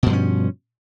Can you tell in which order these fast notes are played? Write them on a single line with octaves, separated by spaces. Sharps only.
B2 G2 F3 C#4